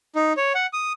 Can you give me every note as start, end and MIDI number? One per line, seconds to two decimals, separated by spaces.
0.15 0.33 63
0.37 0.53 73
0.55 0.66 78
0.73 0.93 87